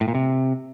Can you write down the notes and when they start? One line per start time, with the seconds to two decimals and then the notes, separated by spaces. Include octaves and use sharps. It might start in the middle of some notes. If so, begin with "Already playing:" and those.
0.01 A2
0.08 A#2
0.15 C3